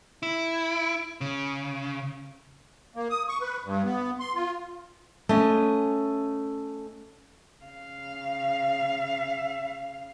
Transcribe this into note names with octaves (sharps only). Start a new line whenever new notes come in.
E4
C#3
A#3
D#6
C#6
B4
G2
B3
C6
F4
A3 C#4 D#5
C#3 F5